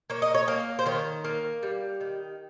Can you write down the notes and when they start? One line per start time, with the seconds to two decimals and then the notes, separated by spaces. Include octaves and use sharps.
0.10 A#3 C#5
0.22 D#5
0.34 C#5
0.48 A#3
0.79 C5
0.86 D#3 C#5
1.24 A#3
1.63 G3
2.00 D#3